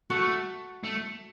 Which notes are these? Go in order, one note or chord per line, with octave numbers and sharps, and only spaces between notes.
A3 F#4
A3